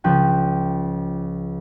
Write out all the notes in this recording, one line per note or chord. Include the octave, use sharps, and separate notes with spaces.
C#2 F3 C#4 G5 F#6